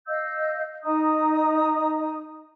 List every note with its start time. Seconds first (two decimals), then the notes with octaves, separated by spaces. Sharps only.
0.07 D#5 F5 E6 G6
0.83 D#4 D#5 A#5 D#6